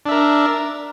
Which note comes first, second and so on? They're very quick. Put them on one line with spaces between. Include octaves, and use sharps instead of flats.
D4 E5 A#4